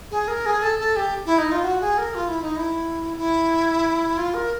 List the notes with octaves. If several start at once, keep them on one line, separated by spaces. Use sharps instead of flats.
G#4
A#4
G#4
A4
A4
G4
E4
D#4
F4
F#4
G#4
A#4
F4
E4
D#4
E4
E4
F4
A#4